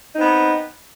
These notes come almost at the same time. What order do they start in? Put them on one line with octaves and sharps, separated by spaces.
D#4 C4 B3